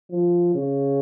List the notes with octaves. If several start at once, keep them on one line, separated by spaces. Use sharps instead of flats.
F3
C#3